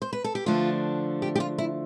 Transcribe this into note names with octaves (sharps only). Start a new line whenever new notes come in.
C5
B4
A4
G4
D3 F3 A3 D4 F4
G4
G4
F4
E4